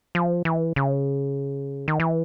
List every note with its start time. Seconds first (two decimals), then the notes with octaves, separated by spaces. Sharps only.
0.15 F3
0.45 E3
0.76 C#3
1.88 D#3
2.00 E3